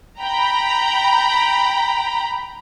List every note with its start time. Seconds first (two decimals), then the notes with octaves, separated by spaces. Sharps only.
0.21 G5 A#5 B5